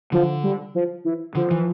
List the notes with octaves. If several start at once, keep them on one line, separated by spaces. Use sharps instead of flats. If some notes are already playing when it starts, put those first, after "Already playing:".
D3 F3
G3
F3
E3
D3 F3
E3